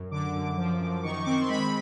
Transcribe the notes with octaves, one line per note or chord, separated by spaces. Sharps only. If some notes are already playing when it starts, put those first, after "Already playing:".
Already playing: F#2
D3 D6
F#2
F3
F#2
D#3 C#6
C4 D6
C#6
C6
G#3 B5